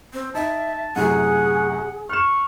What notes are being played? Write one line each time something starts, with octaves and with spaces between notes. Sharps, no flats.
C4
D#4 E5 A5
F#2 A2 C3 G#4 F#5
C#6 F6 F#6 E7